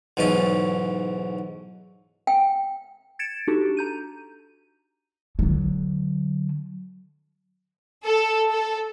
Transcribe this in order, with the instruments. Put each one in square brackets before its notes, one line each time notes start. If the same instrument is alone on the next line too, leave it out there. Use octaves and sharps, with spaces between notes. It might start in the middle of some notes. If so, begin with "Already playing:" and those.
[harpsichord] B1 G#2 E3 C#4 A5
[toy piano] G5
[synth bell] G#6 A6 C#7 D7 E7
D4 D#4 F#4 G4 A4
A#5 G6 D#7
[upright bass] D3 F#3
[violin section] A4
A4